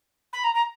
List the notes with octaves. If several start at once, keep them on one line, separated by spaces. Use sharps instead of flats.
B5
A#5
A#5